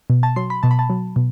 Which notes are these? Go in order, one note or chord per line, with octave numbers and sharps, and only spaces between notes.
B2
A5
F#3 C6
B5
B2 A5
B5
A5
F#3
B2